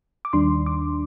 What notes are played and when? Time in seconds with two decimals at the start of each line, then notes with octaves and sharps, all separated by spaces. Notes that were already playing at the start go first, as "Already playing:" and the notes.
0.25 D6
0.33 D#2 D#3 G3 D4 C6
0.66 D6